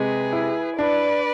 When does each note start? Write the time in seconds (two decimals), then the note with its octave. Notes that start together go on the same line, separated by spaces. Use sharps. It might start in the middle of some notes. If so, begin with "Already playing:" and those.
Already playing: C3 G#3 G#4 B4
0.33 E4
0.78 D4 B4 D5